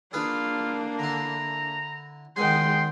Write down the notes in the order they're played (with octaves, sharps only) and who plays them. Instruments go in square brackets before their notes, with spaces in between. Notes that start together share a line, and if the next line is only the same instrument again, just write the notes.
[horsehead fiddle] A#3 D4 [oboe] F4 [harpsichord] G#4 B4
[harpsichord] D3 E4 [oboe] A#5
[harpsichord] D#2 B2 G#5 [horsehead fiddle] G#3 G5 [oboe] C6